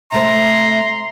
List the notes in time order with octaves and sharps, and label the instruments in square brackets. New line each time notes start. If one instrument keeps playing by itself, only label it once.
[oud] C3 A3 C5 [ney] E5 [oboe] A#5 [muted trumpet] C6